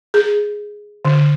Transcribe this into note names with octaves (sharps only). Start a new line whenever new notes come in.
G#4
D3